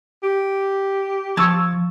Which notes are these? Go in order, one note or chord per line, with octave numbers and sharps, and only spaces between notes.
G4
F3 A5 C#6 E6 G#6